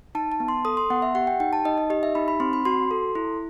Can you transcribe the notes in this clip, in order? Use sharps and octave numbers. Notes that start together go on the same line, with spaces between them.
D#4 A5
A5
B3
C6
A4 D#6
C6
B3 F#5
E5
G4 F#5
G5
D#4 G5
A5
D#4 D#5
D#5
G4 D#5
E5
D#4 B5
B5
C4 C6
B5
F#4 C6
A4
E4